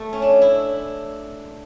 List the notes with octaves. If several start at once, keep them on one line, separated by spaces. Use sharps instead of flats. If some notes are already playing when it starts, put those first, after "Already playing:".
Already playing: A3
C#4
D4
E4